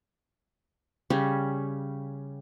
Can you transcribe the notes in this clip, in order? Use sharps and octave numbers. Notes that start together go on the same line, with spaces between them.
C#3 G3 C#4